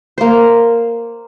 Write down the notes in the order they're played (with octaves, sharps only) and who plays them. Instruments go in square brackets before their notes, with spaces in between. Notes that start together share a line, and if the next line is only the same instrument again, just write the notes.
[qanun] A#3 C5